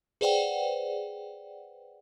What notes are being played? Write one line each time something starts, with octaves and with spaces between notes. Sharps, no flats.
G#4 B4 C5 D5 F#5 G5